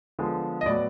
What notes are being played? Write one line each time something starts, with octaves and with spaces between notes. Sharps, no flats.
D3 F3 G#3 B3
D#5
A2 F#3 B3 D5